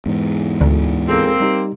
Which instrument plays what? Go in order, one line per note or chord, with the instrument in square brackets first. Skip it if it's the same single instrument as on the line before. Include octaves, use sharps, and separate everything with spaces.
[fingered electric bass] E2 G#2
[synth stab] D2
[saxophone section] A#3 C4 [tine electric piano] F4 G#4 A4
[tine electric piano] G3 D#4 G4